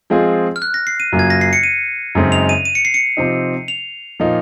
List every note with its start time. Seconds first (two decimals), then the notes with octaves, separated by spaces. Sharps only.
0.10 F3 G#3 C4 F4 G#4
0.56 F6
0.62 F#6
0.74 A#6
0.87 C7
1.00 D#7
1.12 F#2 C#3 F#3 A#3 F4
1.19 G#6
1.30 A#6
1.41 C7
1.53 C#7
1.63 D#7
2.15 F#2 C#3 G#3 C4 D#4
2.32 F7
2.49 D#7
2.65 D#7
2.75 C#7
2.85 C7
2.94 C#7
3.17 C3 F3 C4 D#4
3.68 F7
4.20 A#2 F3 A#3 D#4